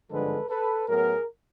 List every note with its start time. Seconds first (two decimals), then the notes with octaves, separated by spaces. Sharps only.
0.11 G#1 G2 D3 F3 G#3 A4 B4
0.49 A4 B4
0.88 A2 F#3 B3 G#4 A#4